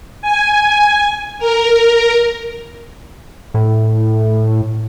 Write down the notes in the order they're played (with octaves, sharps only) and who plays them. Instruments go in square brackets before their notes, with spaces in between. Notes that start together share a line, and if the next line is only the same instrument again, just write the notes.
[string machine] G#5
A#4
[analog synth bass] A2